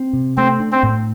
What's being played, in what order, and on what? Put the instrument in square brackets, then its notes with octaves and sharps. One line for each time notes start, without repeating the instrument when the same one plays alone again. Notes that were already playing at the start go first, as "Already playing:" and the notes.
Already playing: [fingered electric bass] C4
C3
[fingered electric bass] A3 [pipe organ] C4
[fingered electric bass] D4
[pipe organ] C4
[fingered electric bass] A2